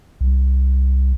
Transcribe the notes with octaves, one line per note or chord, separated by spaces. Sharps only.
C2